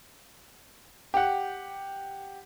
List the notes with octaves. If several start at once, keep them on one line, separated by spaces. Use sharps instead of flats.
G4 F#5